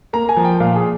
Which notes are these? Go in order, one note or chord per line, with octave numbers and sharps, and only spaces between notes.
A#3 A#5
G#5
F3
G5
A#2 F5
G#4